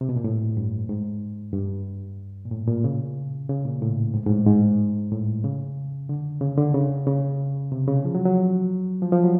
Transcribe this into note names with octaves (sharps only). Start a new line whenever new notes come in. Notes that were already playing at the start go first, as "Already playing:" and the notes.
C3
B2
A#2
A2
G2
G#2
G2
A#2
A2
A#2
C#3
C#3
A#2
A2
G#2
G#2
A2
G#2
A2
C#3
D3
C#3
D3
C#3
C#3
C3
C#3
F3
F#3
F#3
F3
F3
F#3